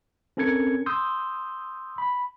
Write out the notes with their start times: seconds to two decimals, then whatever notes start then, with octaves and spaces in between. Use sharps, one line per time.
0.37 C4 C#4 A4 A#4 G#6 C#7
0.86 C6 D#6 E6 G6
1.98 B5